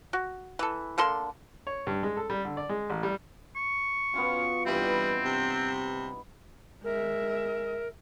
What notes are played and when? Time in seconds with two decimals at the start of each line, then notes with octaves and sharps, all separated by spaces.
0.13 F#4
0.59 E3 A4
0.98 D3 A#3 A4 C6
1.67 C#5
1.87 G2
2.03 G#3
2.17 A4
2.30 G3
2.45 D3
2.57 D5
2.69 G#3
2.90 A1
3.03 G3
3.56 C#6
4.14 B3 C#4 F4 F#4
4.66 G2 E3 G3 C4 E4
4.81 D#4
5.25 C3
6.84 G#3 A#4 E5